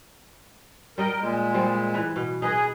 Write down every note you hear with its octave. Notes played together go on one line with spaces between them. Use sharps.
G3 A#4 D#5 G5
A#2 G#3
G3 C4
E3 B4
B2
D#4 G#4 B4 D#5